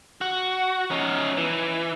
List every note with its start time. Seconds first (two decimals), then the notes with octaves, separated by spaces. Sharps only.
0.21 F#4
0.91 C#4 D#4
1.37 E3